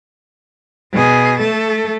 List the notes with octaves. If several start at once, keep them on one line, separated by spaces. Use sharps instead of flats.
B2 G#4
A3 A4